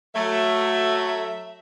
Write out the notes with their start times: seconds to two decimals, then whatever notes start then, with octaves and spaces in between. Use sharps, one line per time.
0.15 F#3 A3 E5